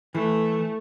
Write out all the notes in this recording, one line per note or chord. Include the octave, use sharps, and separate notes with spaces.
E3 A3